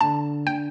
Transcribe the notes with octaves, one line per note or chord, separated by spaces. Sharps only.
D3 A5
D3 G5